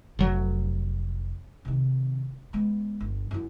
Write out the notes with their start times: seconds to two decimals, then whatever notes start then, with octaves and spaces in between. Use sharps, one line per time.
0.19 F1 F#3
1.65 C3 D#3
2.53 G#3 B3
3.00 G1
3.31 F#2 E4